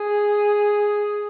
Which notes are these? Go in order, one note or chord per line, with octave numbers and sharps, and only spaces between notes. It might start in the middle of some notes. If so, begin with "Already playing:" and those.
Already playing: G#4